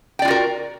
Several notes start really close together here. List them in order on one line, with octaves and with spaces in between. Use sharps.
G5 D5 F4 F#4 A#4